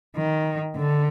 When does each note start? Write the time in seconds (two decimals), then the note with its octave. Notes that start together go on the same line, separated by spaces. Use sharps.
0.16 D#3
0.77 D3